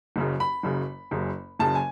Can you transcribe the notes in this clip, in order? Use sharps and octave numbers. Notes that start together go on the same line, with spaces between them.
F#1 F#2 C#3
B5
F#1 F#2 C#3
F#1 F#2 C#3
F#1 F#2 C#3 A5
G#5